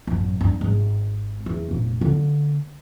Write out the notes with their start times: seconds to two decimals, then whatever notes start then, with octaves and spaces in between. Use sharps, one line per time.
0.07 A1 F#2
0.41 G2
0.61 G#1
1.46 E2
1.68 F1 A#1
2.01 D3 A#3